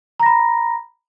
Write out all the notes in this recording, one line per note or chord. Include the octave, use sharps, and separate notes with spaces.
A#5 B5 A#6